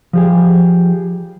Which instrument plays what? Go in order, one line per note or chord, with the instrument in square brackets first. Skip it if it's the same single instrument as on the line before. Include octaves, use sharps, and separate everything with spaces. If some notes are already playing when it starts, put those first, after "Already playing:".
[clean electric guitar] F3 G4 G#4